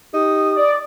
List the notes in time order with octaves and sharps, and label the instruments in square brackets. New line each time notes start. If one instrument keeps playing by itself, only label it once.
[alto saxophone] D#4 [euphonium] G4 [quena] D#6
[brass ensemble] D5